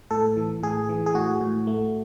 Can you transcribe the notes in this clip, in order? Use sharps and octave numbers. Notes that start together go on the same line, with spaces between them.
A2 A4
E3
A2 G#4
E3
G#4
A2 F#4
A2
A3